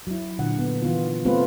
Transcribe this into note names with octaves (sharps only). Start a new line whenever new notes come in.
F#3 E4
A#2 D3 F#5
B3
D#3 E3 B3 F4
A3 B3 C4 F4 G4 B4